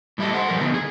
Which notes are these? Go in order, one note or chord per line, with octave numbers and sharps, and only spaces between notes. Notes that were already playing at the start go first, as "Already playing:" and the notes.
A2 G3 E4 G4 A4 D#5
C5 F#5
F3 G3 A#4
D3 B3 D#4
G#4